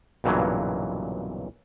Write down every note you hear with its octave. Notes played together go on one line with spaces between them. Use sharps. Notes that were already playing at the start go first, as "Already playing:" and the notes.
B1 G2 A#2 C#3 E3 F#3